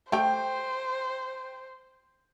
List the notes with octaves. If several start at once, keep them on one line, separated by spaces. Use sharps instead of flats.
A3 G4 C5 G5